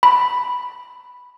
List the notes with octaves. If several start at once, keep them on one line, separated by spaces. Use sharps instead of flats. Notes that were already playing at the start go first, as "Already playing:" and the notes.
B5